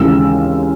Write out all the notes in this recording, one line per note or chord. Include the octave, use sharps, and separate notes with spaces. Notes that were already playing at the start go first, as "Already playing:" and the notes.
Already playing: D#2 C#3 E3 G#3 E6